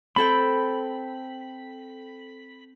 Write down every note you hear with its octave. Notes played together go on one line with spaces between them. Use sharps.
C4 A4 G5 B5